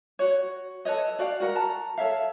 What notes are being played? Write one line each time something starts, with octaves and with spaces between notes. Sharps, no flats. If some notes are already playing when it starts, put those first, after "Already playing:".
F#4 C#5
A4 B4 C#5 D#5
F#4 D5 F5 G5
F#4 A#4 F#5
A5 A#5
A4 C#5 E5 F5